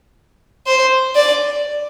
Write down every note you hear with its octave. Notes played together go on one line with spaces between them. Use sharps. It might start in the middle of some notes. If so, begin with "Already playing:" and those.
C5
D5